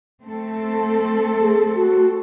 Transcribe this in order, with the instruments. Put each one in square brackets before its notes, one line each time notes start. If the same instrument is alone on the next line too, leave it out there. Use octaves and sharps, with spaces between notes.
[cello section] A3 C4 A4
[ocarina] G#4
F#4